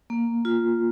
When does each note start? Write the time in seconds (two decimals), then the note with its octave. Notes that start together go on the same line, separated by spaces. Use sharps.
0.10 A#3
0.45 F4